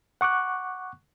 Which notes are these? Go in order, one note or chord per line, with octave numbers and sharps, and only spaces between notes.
F#5 C#6 D6 F#6